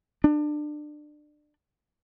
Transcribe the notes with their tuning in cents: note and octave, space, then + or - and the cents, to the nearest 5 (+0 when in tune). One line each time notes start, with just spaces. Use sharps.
D4 +25